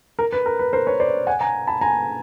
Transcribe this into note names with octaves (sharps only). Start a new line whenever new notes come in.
A#4
B4
A#4
B4
A#4 C5
B4 C#5
C5 D5
F#5 G#5
G#5 A#5
A5 B5
G#5 A#5